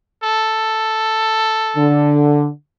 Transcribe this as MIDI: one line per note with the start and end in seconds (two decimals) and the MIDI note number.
0.23 2.14 69
1.76 2.47 50